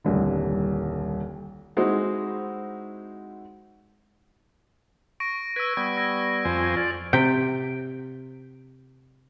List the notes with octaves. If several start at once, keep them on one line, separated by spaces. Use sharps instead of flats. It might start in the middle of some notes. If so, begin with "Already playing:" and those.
D#1 C2 D3
G#3 C4 D#4 E4 F#4
C#6 A#6 D7
B4 E6 G#6 D7
G3 B3 G#6 A#6
E6 A#6 D7
F2 C5 G#5
F4 D5
C3 G5